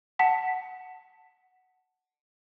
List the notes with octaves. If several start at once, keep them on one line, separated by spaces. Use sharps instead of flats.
F#5 A5 B6